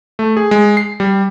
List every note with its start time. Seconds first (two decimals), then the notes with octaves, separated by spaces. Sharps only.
0.19 A3
0.37 G#4
0.51 G#3
0.77 C7
1.00 G3